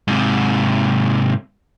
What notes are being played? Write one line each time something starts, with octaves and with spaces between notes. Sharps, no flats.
G#2 C3